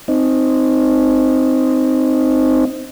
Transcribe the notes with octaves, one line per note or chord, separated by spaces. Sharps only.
C4 D#4